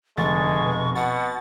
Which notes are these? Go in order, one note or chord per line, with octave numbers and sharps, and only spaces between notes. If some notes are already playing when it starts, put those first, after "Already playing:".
F1 D3 G#3 C#6 A6
B2
B2 F#5 A6